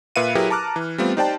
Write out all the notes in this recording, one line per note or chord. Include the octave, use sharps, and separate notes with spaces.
A#2 B4 E5 F5 C#7 D#7
F#3 E4 G4 G#4 A#4 B4
A5 A#5 D6 F6 F#6
E3
G3 A3 B3 C4 F4
D#4 G4 C5 D5 G5 A5